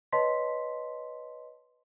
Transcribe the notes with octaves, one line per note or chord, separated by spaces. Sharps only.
B4 C#5 D#5 A5 C6 B6